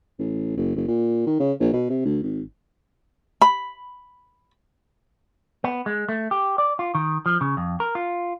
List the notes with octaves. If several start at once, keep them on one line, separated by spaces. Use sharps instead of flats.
A1
F#1
F#1
A#2
D#3
C#3
A#1
B2
C3
D2
G#1
B5
B3
G#3
A3
G4
D5
F4
D#3
F3
C#3
F2
A#4
F4